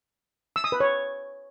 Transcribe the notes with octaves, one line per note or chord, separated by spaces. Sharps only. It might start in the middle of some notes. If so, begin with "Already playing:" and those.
E6
D#6
B4
C#5